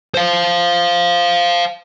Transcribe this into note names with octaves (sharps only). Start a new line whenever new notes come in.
C5 F5